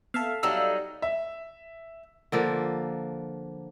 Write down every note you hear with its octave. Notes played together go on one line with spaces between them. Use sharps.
B3 A4 E5 F5
F#3 G3 D#4 E6
E5
D3 F3 A#3